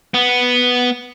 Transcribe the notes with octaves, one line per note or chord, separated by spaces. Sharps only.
B3